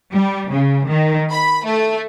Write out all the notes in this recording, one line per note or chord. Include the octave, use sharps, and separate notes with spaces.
G3
C#3
D#3
B5
A3